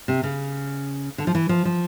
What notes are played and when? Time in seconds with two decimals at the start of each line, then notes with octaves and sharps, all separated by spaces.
0.08 C3
0.23 C#3
1.18 D3
1.27 F3
1.35 E3
1.49 F3
1.65 F3